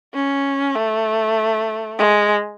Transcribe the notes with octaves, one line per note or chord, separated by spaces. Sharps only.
C#4
A3
G#3